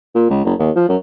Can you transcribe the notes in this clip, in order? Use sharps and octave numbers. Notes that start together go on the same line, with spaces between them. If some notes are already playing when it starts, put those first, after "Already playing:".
A#2
C#2
F#1
D#2
F3
F#2